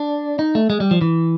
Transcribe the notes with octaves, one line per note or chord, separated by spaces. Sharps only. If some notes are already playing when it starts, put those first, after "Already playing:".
Already playing: D4
D#4
A3
G#3
G3
F3
E3